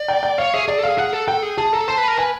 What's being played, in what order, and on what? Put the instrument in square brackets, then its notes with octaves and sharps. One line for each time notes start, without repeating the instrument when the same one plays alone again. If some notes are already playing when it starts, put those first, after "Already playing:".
Already playing: [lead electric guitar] D5
[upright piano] G5
G5
[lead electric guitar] C#5 [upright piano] F5
[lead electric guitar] G#4 [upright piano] E5
[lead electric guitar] G#4 [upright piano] D5
[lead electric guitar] A4
[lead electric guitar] G#4 [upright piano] F5
[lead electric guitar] G#4 [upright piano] F#5
[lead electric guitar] A4
[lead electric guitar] A4 [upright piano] G5
[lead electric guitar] G#4
[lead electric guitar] G#4 [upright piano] A5
[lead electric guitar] A4 [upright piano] A#5
[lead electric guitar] C5 [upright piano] A5
[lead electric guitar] B4
A#4
[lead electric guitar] B4 [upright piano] G#5